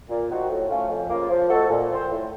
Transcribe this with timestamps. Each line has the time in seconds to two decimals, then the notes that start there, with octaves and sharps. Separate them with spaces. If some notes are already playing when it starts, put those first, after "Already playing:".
0.09 A#2
0.30 F3 C4 D#4 F#4
0.49 A2
0.69 A3 C#4 F4
0.89 F2
1.09 C#3 F3 A#3 F4
1.30 F3
1.49 A3 D#4 F#4 A4
1.69 A#2
1.89 F3 C4 F4 C5
2.10 A2